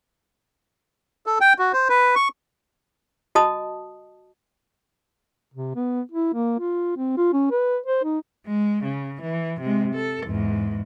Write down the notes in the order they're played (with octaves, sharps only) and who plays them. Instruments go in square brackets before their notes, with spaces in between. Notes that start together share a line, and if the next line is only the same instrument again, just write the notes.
[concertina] A4
G5
F#4
C5
B4
C#6
[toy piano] F#4 D#5 A5 D#6
[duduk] C3
B3
E4
A#3
F4
C4
F4
C#4
B4
C5
D#4
[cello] G#3
C#3
E3
C3 G#3
A4
E2 G#2